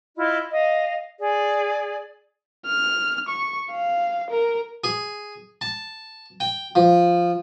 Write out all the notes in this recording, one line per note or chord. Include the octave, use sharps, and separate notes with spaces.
E4 F4 D#5
D#5 F5
G#4 D5
F6
C#6
F5
A#4
G#4
A5
G5
F3